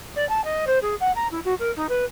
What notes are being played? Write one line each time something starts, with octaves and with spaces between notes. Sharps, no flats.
D5
A5
D#5
C5
G#4
F#5
A#5
E4
F#4
A#4
D#4
B4